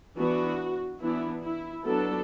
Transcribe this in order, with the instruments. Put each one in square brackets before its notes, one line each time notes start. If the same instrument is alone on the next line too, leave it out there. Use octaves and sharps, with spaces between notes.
[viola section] E3 B3 D4 F#4
E3 B3 D4 E4
E4
F#3 B3 D4 A4